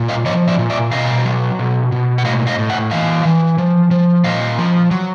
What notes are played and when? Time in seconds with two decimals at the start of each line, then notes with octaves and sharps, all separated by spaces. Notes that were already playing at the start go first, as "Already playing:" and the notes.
Already playing: A#2
0.09 D#5 F5
0.26 F3 C#5 D#5
0.48 D5 E5
0.59 A#2
0.70 D5 E5
0.92 B2 D#5 F5
1.25 F#3
1.59 B2
1.92 B2
2.18 F#5
2.25 A2 D#5 F5
2.47 D#5 F5
2.59 A2
2.69 E5 F#5
2.91 E3 D#5 F5
3.25 E3
3.58 F3
3.91 F3
4.24 A#2 D#5 F5
4.59 F3
4.91 F#3